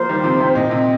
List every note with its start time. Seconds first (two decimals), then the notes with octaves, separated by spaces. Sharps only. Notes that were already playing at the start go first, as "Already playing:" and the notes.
Already playing: F3 A#3 C5
0.09 D#3 G3
0.24 C3 F3
0.40 C3
0.55 A#2 D#5
0.71 C3